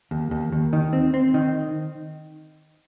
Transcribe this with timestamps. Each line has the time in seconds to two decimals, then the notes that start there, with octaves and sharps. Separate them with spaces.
0.11 D#2
0.31 D#2
0.52 D#2
0.73 D#3
0.93 C4
1.14 C4
1.34 D#3